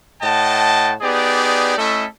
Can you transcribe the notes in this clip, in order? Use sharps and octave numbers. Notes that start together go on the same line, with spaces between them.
A2 D#5 F#5 G5 A5
B3 D#4 G4 G#4 D5
A3 C#4 E4 A4 D#5 E5